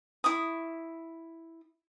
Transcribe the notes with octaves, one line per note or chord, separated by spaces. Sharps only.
E4 C#6 D#6